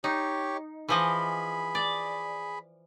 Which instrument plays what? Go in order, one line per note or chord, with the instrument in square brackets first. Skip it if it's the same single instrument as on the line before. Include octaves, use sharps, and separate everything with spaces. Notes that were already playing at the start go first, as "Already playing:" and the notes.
[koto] D#4 [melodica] G4 C#5
[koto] E3 F3 D#5 [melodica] G#4 B5
[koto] D5